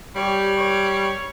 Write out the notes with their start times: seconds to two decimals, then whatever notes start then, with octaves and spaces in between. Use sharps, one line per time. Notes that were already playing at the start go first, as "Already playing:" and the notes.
0.15 G3 G4 C#5
0.57 C#5